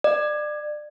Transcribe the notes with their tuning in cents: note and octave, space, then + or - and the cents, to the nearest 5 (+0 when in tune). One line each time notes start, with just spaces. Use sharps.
D5 +30